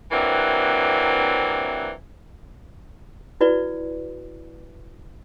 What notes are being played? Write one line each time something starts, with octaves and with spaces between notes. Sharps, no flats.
C3 E3 F#3 A#3 C4 D4
E4 F#4 B4 D5